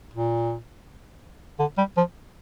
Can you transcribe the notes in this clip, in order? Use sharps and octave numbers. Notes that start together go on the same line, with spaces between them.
A#2
D3
G3
F3